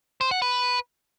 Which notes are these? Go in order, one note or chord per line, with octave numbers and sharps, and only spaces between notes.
C5
F#5
B4